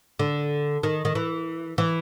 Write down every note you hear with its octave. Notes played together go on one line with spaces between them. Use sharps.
D3
D#3
D#3
E3
E3